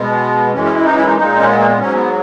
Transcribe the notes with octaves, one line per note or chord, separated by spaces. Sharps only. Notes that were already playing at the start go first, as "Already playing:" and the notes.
Already playing: B2 G#3 B3
F#2 E3 G#3 C#4
C#4
E4
D#4
E4
D#4
A#2 G#3 D#4
C#4
B3
A#3
B3
G#2 F#3 C#4
B3